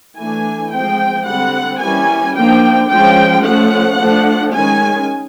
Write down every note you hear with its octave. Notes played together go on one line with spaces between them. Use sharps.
E3 A3 D4 G#5
F3 G#3 C4 G5
D3 G3 C4 F#5
E3 G3 A#3 C#4 G#5
F3 A#3 D4 G5
F3 G#3 C#4 G5
F3 A3 C#4 F#5
F3 A3 D4
D#3 G#3 C#4 G#5